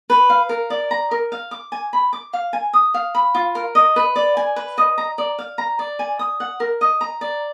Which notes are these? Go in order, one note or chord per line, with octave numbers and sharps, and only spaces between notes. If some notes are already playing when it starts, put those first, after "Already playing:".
B4
F5
A#4
D5
A#5
A#4
F5
D6
G#5
B5
D6
F5
G#5
D#6
F5
B5
F4
A#4
D#5
B4
D5
G#5
B4
D#5
A#5
D5
F5
A#5
D5
G#5
D#6
F#5
A#4
D#5
A#5
D5